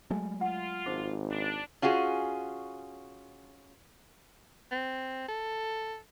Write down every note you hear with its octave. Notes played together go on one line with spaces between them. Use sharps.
F#3 G#3 A3 G#5
F4 F#5
G#1 D#4 C5 D6
D4
C#4 F4 F#4 G#4
C4
A4